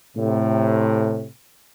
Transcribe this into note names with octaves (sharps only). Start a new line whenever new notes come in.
A2 C3